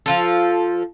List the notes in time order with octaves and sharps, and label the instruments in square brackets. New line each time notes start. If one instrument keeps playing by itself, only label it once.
[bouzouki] F3 F4 A4